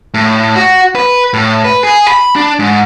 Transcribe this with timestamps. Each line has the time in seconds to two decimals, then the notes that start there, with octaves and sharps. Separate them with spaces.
0.14 A2
0.56 F#4
0.95 B4
1.33 A2
1.64 B4
1.84 G#4
2.08 B5
2.36 D4
2.59 G#2